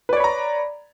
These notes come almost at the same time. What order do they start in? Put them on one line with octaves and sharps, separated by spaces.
B4 D5 C#5 B5 A#5